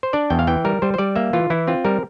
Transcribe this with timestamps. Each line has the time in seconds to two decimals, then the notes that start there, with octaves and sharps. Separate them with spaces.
0.03 C5
0.13 D4 D5
0.30 E2 G5
0.39 F5
0.47 E3 G5
0.65 G3 A#4
0.82 G3 C5
0.94 C5
0.98 G3 D5
1.16 A#3 E5
1.33 E3 F4
1.50 E3 E4
1.67 C4 F4
1.85 G3 A#4